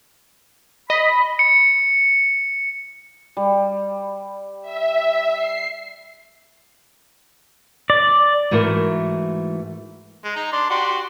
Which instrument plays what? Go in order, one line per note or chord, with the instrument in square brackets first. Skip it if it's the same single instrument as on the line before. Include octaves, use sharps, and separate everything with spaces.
[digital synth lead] D#5 [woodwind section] B5
[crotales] C#7
[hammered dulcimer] G3
[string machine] E5
C7
[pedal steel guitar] D5
[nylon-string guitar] G#2 E3 A3 F#4 A#4
[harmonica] G#3
D#4 A#5
D4 D5 C6
F#4 G4 C6